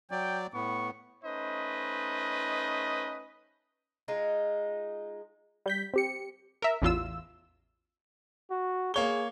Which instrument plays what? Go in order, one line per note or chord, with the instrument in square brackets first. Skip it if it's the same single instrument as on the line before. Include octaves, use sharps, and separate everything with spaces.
[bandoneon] F#3 D5 [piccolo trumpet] G5
[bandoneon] A2 B3 [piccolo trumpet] C#6
[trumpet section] A3 C#4 D#4 B4 C5 D#5
[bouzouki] G#3 D#4 F4
[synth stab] G3 G6 B6
C4 G4 C#7
A#4 E5
A1 E2 F4 E6
[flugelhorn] F#4
[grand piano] A#3 C#5 G7 [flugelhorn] G#4